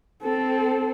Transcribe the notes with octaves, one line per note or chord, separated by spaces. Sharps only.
C4 A4